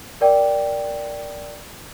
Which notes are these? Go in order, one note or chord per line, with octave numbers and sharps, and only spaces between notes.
A#4 D5 G5